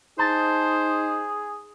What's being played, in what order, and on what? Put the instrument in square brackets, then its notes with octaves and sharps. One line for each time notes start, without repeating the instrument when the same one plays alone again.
[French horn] D#4 [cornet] G#4 [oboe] C5 [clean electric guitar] A5